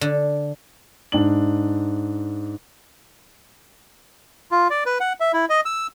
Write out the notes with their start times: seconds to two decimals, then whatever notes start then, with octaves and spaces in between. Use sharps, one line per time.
0.01 D3
1.12 G#2 D4 F#7
4.51 F4
4.70 D5
4.86 B4
5.00 F#5
5.20 E5
5.33 E4
5.50 D#5
5.65 E6